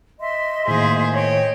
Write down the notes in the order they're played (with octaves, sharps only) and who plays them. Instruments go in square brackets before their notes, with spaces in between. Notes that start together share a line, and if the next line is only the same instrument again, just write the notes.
[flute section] D#5 E5 C6
[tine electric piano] A2 D#3 [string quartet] A#3 G#4 C5
[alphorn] C#5 [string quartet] D#5 [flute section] G5